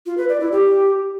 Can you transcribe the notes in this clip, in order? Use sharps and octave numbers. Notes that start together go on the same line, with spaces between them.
F4
B4
D5
E4
G4